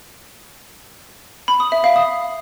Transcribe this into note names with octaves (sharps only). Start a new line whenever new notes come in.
B5
D#6
E5
F5
D#6